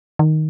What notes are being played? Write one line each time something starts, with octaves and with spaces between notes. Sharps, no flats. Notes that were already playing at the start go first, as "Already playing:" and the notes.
D#3